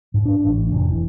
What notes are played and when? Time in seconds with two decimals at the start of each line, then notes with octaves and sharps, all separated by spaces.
0.14 G#2
0.26 D4
0.45 A1
0.72 F1
0.89 E3